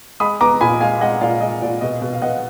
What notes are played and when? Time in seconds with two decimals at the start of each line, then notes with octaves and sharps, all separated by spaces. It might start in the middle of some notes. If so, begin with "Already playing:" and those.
0.20 G#3 B5 D#6
0.41 B3 A#5 D6
0.61 A#2 G#5 B5
0.81 G#3 F5 G#5
1.01 G#3 D#5 F#5
1.21 A#2 D5 F5
1.41 G#3 D#5
1.62 A#2 D5
1.81 B2 D#5
2.02 B2
2.13 F5
2.22 B3 D#5 F#5